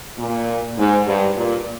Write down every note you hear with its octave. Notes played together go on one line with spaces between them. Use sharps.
A#2
G#2
G2
A#2